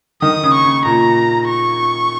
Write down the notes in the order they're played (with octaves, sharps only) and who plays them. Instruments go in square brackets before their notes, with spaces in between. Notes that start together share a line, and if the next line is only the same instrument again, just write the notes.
[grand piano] D#3 [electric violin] D#6
[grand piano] C#3
[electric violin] C#6
[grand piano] C#3
[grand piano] A#2 [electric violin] A#5
[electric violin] C#6